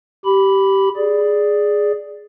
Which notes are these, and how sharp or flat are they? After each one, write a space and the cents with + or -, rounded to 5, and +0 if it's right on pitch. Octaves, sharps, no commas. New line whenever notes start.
G4 -15 B5 +0
G#4 +0 D5 +0